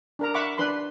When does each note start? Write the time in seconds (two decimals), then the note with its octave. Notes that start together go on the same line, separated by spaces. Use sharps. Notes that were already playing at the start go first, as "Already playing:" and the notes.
0.19 D4 A#4 A#5
0.34 E5 F#5 B5 C#6 D6
0.58 D4 B4 B5 C6